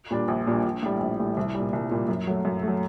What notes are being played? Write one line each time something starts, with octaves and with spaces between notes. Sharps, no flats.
A#2 G3 D4
A#1
A#2 G3 D4
A#1
A2 G3
A#1
A2 G3
C2
A#2 G3
C2
A#2 G3
F#2
F#3 A3
F#2
F#3 A3